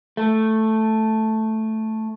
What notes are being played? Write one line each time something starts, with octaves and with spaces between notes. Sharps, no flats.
A3